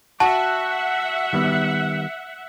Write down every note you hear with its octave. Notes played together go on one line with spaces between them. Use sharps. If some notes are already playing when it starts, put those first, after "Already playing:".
F#4 E5 F#5 A5
D#3 G3 B3